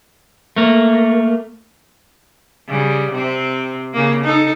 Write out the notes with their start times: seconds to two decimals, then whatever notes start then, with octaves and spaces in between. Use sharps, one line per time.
0.56 A3 A#3
2.68 C#3 G3
3.11 C3 C4
3.93 C#3 A#3
4.24 D#4 A4